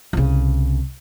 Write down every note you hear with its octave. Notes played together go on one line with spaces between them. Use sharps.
C2 C#3